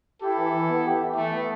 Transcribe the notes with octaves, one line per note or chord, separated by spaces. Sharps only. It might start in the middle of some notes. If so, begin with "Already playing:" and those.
E4 G4 A4
E3
E3
B3
G4
E3
E3 A3
B3